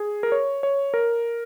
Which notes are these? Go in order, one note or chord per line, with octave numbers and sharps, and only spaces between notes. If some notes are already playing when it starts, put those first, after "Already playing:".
Already playing: G#4
A#4
C#5
C#5
A#4